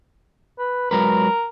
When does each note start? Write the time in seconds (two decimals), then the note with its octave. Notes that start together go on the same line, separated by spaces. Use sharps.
0.58 B4
0.91 F#3 G#3 A#4 B4